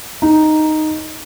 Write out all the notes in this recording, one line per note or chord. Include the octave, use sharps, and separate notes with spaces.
D#4